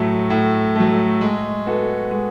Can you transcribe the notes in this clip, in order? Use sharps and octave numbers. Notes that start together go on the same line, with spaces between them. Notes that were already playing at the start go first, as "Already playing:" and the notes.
Already playing: A2 F#3 A3
A2
F#3 A3
G#3
B3 F#4 A4
G#3